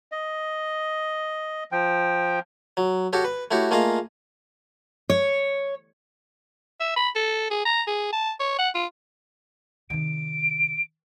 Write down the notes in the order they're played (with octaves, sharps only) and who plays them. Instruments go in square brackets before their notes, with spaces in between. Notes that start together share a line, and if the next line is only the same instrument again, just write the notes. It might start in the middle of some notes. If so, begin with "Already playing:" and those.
[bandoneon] D#5
F3 G5
[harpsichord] F#3
F#4 G4 A4 C#5
B4
A3 E4 F#4 G4 C#5
A3 A#3 F4 G#4 D#5 F5
[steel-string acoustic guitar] C#5
[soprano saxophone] E5
B5
A4
G#4
A#5
G#4
A5
C#5
F#5
F4
[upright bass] C3 D#3 [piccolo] D7